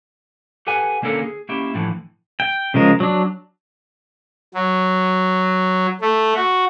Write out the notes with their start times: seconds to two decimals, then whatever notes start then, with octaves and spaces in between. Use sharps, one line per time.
0.67 G4 A4 B4 F#5 G#5
1.02 D3 A#3 C#4 D4 A4 A#4
1.23 G#4
1.49 A#3 C#4 E4 G4
1.75 A2 D3 E3 F3
2.40 G5
2.74 C#3 F3 G#3 A#4
3.00 F#3 D4
4.55 F#3
6.01 A3
6.35 F#4